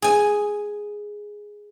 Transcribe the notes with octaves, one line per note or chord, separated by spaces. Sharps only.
G#4 G#5